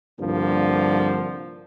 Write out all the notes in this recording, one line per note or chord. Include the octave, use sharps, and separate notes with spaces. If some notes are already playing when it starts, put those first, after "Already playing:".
C2 G2 D3 F3 A#3